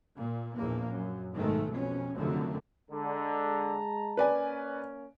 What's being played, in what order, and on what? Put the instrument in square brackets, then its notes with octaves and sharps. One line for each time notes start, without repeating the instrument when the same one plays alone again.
[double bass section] A#2
A#1 E2 A#3
F#2
B1 G#2 D#3 G#3 A3
F2 B2 C#4
F1 F#2 D3 D#3 A3
[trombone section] D3 [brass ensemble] G#3 A5 A#5
[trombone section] A#3 C#4 [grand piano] B4 D5 G#5